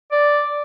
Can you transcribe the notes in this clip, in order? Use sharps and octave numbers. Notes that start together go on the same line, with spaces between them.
D5